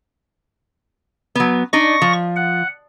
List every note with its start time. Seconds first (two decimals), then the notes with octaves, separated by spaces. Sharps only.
1.35 F#3 B3
1.73 D4 D#4 D5 C#6 A#6
2.02 F3
2.36 F#5